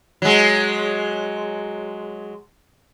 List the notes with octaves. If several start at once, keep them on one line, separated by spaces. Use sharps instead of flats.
F#3 G#3